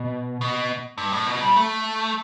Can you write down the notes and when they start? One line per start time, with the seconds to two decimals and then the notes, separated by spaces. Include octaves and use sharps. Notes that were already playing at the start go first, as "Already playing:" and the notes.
Already playing: B2
0.41 B2
0.98 G2
1.12 A2
1.27 B2
1.41 G3
1.56 A3